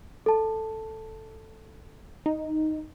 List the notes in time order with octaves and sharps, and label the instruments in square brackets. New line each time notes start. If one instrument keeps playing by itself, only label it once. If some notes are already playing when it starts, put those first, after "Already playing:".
[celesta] A4 A5
[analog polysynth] D#4